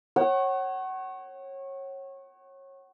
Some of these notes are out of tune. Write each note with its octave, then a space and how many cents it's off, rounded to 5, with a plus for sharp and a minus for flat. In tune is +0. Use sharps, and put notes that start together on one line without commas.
C#5 -25 F#5 +30